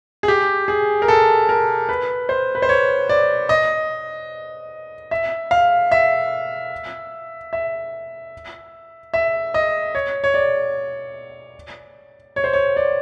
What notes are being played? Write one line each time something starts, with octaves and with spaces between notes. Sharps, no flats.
G#4
G4
G#4
A#4
A4
A#4
B4
C5
B4
C5
C#5
D5
D#5
E5
F5
E5
E5
E5
D#5
C#5
C#5
D5
C#5
C5
C#5
D5